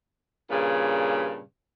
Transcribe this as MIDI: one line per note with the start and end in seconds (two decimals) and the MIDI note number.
0.50 1.40 43
0.50 1.40 46
0.50 1.40 49